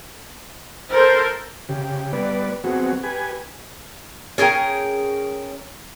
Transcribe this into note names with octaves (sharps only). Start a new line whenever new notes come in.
A4 A#4 C5
C#3 G4
G3 B3 B4 D5
F#3 B3 C4 F#4 G#4
G4 B4 G#5
C#4 G#4 A#4 G5